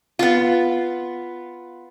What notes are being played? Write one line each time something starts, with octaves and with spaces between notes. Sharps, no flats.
B3 F4